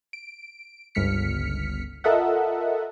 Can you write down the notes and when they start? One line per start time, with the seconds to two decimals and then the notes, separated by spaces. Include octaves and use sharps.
0.13 D7
0.95 G1 C#2 F6 B6 C#7
2.04 F4 A4 A#4 D#5 E5 F#5